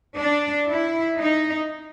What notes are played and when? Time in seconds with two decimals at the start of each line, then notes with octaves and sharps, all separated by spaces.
0.18 D4
0.70 E4
1.20 D#4